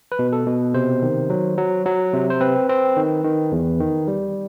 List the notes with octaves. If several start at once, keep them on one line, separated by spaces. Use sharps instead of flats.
B4
B2
A4
B2
C3 C5
D#3
F#3
F#3
F#3
C3
C5
C4 B4
C4
D#3
D#3
E2
D#3
G3